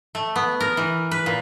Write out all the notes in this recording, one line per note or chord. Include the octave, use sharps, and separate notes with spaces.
A3
B3
A#4
E3
B4
A#2